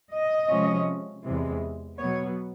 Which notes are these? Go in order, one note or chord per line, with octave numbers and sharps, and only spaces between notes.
D#5
C3 F3 G#3 C#4
E2 C3 E3 G#3
B2 F#3 B3 C#5